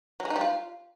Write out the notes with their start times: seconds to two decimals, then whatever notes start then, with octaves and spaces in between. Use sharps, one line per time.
0.20 F#3
0.25 G#3
0.30 D#4
0.36 G3
0.41 F4